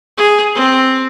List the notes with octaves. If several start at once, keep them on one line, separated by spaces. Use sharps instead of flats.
G#4
C4